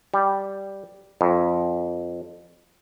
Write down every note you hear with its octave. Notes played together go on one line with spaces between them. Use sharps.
G3
F2